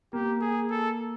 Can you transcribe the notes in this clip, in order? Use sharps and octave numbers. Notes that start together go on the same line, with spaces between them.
A#3 G4
G#4
A4